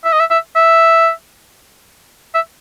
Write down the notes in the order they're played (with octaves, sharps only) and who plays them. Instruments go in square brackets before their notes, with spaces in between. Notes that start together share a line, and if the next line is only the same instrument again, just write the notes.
[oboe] E5
D#5
E5
E5
E5
E5